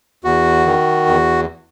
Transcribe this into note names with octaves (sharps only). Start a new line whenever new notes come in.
E2 F#4
D#3
E2